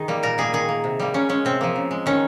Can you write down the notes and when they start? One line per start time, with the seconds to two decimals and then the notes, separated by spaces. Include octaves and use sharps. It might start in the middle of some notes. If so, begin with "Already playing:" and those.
Already playing: D#3 G#4
0.08 G3 A#3
0.23 A#2 A#4
0.38 G3 A#3 G#4
0.53 D#3 G#4
0.69 A#3
0.84 C3
1.00 G3 A#3
1.14 C#3 C#4
1.29 G#3 C#4
1.45 C3 C4
1.61 F3 A#3
1.76 C#3
1.91 G#3
2.06 D#3 C#4